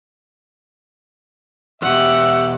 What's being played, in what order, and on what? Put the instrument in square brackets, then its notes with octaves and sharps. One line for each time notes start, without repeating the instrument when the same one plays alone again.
[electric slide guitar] E2 B2 [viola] G4 F#5 [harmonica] E5